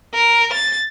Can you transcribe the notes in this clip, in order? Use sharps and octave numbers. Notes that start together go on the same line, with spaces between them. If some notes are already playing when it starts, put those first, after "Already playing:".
A#4
A6